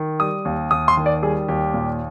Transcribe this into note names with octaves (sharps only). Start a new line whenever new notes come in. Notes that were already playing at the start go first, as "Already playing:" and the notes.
Already playing: D#3
G3 D#6
D#2
D#2 D#6
C6
D#3
D5
G3 G#4
D#2 G4
A#2